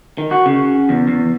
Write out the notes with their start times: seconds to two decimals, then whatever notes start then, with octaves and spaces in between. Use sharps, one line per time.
0.18 D#3
0.31 F#4
0.46 C#3
0.89 E2
1.08 E2